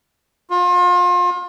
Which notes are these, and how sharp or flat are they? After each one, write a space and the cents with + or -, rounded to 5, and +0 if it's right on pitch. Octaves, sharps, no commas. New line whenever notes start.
F4 +35